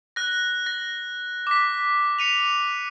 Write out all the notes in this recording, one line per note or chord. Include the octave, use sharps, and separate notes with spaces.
F#6 A#6
A#6
D6 B6
C#7 D#7 F7